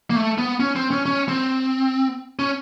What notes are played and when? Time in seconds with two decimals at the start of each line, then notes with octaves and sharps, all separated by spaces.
0.10 A#3
0.16 A3
0.38 B3
0.60 C#4
0.76 C4
0.91 C#4
1.06 C#4
1.28 C4
2.39 C#4